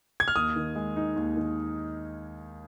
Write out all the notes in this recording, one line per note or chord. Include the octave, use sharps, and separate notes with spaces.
G#6
F6
D#2 D#6
D#3
G#3
D#4
D#2
D#3